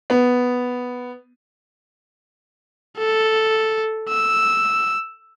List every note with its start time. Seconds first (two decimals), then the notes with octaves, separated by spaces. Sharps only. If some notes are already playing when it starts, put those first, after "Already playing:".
0.10 B3
2.98 A4
4.09 E6